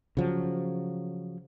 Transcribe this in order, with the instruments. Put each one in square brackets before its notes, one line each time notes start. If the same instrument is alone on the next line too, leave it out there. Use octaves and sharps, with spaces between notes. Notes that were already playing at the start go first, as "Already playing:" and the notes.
[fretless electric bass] C#3 F3 F#3